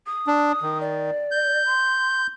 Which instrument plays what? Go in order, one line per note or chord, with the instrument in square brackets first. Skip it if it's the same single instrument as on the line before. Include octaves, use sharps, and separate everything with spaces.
[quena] D#6
[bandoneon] D4
D#3
[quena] D5
[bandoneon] G6
[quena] C6